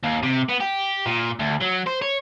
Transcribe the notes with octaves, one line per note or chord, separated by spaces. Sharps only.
D#2
C3
B3
G4
A#2
D2
F#3
C5
C#5